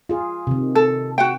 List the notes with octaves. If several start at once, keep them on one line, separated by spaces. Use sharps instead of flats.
F4 G#4
C3 D#3
A4
F#4 F#5 G5